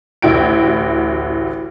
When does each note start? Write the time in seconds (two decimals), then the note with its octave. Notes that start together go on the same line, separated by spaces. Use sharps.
0.22 A1 D2 E4 F#4 G5 D7